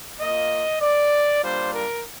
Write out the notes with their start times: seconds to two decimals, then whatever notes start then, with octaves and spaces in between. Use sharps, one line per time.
0.20 A#3 F4 D#5
0.81 D5
1.42 G3 A#3 D4 F4 C5
1.72 A#4